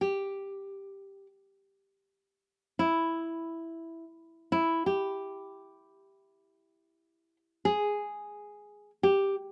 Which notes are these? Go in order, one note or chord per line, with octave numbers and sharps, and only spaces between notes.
G4
E4
E4
G4
G#4
G4